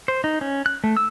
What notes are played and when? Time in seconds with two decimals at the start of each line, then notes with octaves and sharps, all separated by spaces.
0.08 C5
0.24 D#4
0.41 C#4
0.66 F#6
0.84 A3
0.97 E6